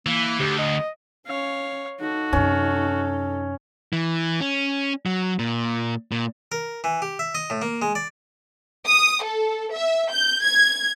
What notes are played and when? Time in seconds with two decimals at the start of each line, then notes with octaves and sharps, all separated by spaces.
0.06 E3 A#3
0.40 D2 G4
0.58 D#5
1.26 C#4 C#5 F5
2.00 D#4 F#4 A4
2.33 F#2 C3 C#4
3.93 E3
4.41 C#4
5.06 F#3
5.39 A#2
6.12 A#2
6.52 A#4
6.84 E3
7.02 G4
7.19 E5
7.35 D#5
7.50 A2
7.62 A#3
7.82 G#3
7.95 D5
8.86 D#6
9.24 A4
9.73 E5
10.13 G6
10.44 G#6